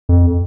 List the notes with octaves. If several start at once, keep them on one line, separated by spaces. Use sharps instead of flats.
F2